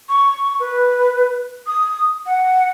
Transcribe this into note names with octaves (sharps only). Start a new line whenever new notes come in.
C#6
B4
D#6
F#5